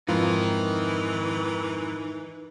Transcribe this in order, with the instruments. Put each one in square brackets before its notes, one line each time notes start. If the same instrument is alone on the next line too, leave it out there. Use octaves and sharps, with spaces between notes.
[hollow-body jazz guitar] F2 G#2 F4 [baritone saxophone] E3 [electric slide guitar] D#4 A#4